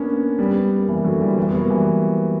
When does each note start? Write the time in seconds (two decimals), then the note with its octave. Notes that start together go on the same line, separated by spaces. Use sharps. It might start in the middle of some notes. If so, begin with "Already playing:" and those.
Already playing: A#3 B3 C#4 D4
0.39 G3 B3
0.78 A#3
0.88 E3 G3
1.04 D3 F#3
1.21 E3 G3
1.37 E3 G3
1.49 B3
1.54 F#3 A#3
1.70 E3 G3